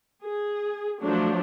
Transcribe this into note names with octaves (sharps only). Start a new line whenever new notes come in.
G#4
F3 F#3 A3 D4